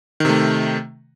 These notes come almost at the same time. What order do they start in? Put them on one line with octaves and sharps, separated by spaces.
D#3 C3 A3